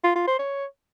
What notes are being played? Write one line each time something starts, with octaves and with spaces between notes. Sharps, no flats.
F4
F4
C5
C#5